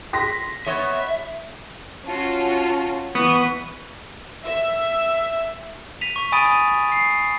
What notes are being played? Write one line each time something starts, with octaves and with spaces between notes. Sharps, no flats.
C6 A#6 B6
B3 C#5 D#5 E5
C#4 F4 F#4 A5
E3 B3 C#6 D#6
E5
B6 D#7 F7
C#6
G#5 B5 D#6 A6 D7 D#7
C7